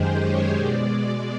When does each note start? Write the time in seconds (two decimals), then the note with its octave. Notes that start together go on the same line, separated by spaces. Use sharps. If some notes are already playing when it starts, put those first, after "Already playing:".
Already playing: F#2 D#3 G#3 G4 G#4 C5
0.19 C#5
0.54 B2 G#3 D5